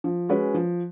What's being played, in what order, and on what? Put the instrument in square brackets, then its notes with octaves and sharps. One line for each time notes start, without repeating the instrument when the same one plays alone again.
[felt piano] F3
G#3 C#4 F#4 B4
F3